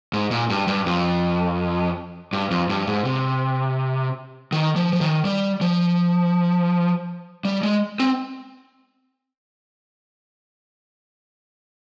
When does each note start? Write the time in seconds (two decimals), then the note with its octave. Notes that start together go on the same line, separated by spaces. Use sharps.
0.13 G#2
0.31 A#2
0.50 G2
0.67 G2
0.86 F2
2.33 G2
2.51 F2
2.70 G2
2.87 G#2
3.05 C3
4.52 D#3
4.76 F3
4.93 F3
5.01 D#3
5.25 G3
5.61 F3
7.45 G3
7.63 G#3
8.00 C4